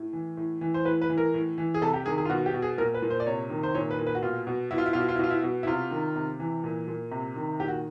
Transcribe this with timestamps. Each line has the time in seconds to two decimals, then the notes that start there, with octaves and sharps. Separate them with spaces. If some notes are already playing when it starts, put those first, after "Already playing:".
Already playing: A2
0.13 E3
0.37 A2
0.61 E3
0.74 C5
0.85 A2 B4
1.02 B4
1.10 E3
1.18 A#4
1.34 A2
1.58 E3
1.74 G#4
1.82 C3 A4
1.94 G4
2.06 D#3 G#4
2.18 G#4
2.25 F4
2.30 B2 F#4
2.46 G4
2.54 B2
2.62 G#4
2.78 A#2 A#4
2.94 B4
3.02 A#2
3.10 C5
3.20 D5
3.26 C3 C#5
3.50 D#3
3.63 C5
3.74 A#2 C#5
3.91 B4
3.99 A#2
4.07 B4
4.15 F#4
4.22 B2 F4
4.47 B2
4.71 B2 E4
4.78 F4
4.86 E4
4.93 B2 F4
5.01 E4
5.08 F4
5.15 E4
5.19 B2 F4
5.31 E4
5.43 B2
5.63 E4
5.67 C3 F4
5.91 D#3
6.16 C3
6.40 E3
6.64 A#2
6.88 A#2
7.11 C3
7.36 D#3
7.60 A#2 G4
7.68 F#4